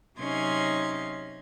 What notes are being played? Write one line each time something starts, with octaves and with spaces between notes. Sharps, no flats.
C3 F#3 C#4 D#4 C6 G#6